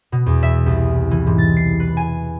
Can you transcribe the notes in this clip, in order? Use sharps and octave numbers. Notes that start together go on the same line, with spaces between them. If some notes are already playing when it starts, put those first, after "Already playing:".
B2
E2
E5
C2
E3
G#2
A6
C7
B4
G#5